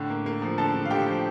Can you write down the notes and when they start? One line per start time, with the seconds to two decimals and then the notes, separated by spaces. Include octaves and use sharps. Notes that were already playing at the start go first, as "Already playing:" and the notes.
Already playing: A2 D3
0.10 A#3
0.26 A#3
0.42 F3
0.58 D3 A4 A5
0.74 D3
0.85 F5
0.90 D3 G4 G5
1.06 F3